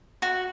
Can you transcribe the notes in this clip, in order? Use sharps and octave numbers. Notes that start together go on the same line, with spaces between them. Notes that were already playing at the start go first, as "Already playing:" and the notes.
F#4